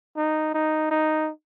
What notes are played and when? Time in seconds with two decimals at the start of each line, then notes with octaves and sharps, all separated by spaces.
0.17 D#4
0.54 D#4
0.91 D#4